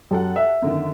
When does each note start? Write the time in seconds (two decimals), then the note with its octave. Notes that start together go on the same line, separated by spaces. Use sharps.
0.11 F#2 G4 A4 F#5
0.36 E5
0.62 F#2 D3 D#3